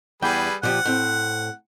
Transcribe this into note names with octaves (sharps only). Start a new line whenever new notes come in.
E2 G3 G#4 B4 G5
A#2 F3 G4 F#5
A2 C4